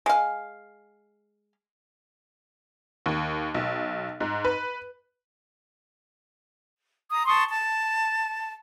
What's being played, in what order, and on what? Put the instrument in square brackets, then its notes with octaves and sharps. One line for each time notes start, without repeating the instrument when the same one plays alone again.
[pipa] G#3 F5
[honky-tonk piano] D#2
B1
G#2
B4
[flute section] A#5 D#6
A5 C6 C#6 D#6
A5